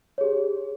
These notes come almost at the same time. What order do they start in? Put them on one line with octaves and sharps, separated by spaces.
C#5 G#4 G4